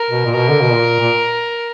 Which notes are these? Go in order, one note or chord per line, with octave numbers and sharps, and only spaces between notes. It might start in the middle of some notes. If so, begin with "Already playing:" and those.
Already playing: A#4
B2
A#2
B2 A#4
D3
B2
A#2
A#2